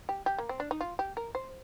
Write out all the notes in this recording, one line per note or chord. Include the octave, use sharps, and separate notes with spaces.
G4
G4
A#3
C4
D4
D#4
F4
G4
A#4
C5